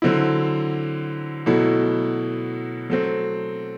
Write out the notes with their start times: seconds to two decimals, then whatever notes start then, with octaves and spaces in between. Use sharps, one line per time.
0.02 D3 F#3 C4 E4
1.46 B2 F#3 A3 E4
2.90 F#3 A3 C4